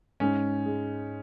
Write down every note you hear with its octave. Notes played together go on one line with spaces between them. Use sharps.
G#2 C#4
G#3